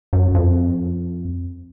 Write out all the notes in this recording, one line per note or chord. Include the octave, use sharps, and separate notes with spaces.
F#2
F2